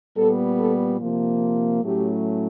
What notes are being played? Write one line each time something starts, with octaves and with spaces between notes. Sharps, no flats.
A#2 G3 B3 A4
A4
C3 F3 A#3
A2 F#3 A3 C#4 G4